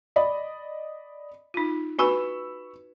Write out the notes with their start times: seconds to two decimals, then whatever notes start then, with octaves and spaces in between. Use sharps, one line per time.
0.16 D5 D#5 B5
1.54 D#4 F4
1.99 F#4 B4 G#5 B5 C#6 E6